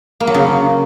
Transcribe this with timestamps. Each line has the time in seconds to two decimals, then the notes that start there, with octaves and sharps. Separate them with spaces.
0.20 A#3
0.27 F#3
0.34 C#3